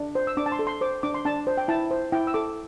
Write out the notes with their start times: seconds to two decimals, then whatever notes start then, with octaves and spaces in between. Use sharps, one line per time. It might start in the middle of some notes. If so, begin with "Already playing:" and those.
Already playing: D4
0.15 C5
0.27 E6
0.37 D4 D6
0.46 A5
0.52 C6
0.59 A4
0.67 C6
0.81 C5 D6
1.03 D4 D6
1.14 C6
1.25 D4 A5
1.47 C5
1.58 G5
1.68 E4 A5
1.91 C5
2.12 E4 G5
2.27 E6
2.34 A4 D6